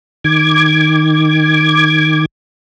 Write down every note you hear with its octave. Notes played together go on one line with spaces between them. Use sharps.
D#3 D6 G#6